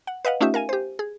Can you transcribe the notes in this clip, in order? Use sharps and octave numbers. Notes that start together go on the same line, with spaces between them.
F#5
B4 D#5 F5 F#5
A3 C#4 D#4 F4 G4 E5
A#4 F5 G#5 D#7
G4 C5
G#4